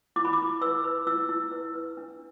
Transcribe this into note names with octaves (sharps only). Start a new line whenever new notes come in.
E4 D6
B5
D6
E4
B4 E6
B4
E4 E6
E4
B4
B4
D4